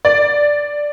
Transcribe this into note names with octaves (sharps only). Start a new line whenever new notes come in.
D5